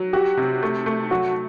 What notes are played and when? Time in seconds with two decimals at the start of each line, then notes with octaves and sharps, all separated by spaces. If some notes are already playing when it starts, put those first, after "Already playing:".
Already playing: F#3
0.13 F#4 G4
0.37 C3
0.63 A3
0.86 A3
1.11 F#3 F#4